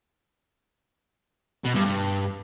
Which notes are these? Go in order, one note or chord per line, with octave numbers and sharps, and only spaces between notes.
B2
G2
G2